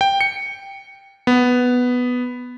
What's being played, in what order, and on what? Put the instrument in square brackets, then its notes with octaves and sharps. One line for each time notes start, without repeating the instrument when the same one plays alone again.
[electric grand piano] G5
C#7
B3